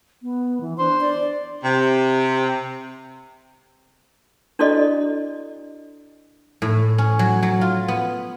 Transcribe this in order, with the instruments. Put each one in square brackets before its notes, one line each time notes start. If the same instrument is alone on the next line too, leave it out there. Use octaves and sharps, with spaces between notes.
[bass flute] B3
E3
[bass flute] D4 [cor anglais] C5
[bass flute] D5
[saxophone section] C3
[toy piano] D4 E4 F#4 A4 D5 D#5
[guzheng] A2
C#4
F#3
F#3
F4
B3